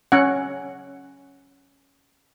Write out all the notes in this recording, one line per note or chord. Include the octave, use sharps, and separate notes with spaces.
C#4 F#5